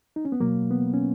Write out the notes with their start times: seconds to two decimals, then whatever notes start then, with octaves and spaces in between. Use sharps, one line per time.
0.16 D#4
0.25 C#4
0.32 B3
0.40 B2 F#3 A#3
0.71 B3
0.94 C#4